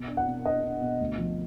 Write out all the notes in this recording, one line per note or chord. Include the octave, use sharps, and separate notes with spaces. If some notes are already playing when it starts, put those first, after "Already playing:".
Already playing: B2
D4
F#5
B2
D4 D#5
D4
B2
D2
F3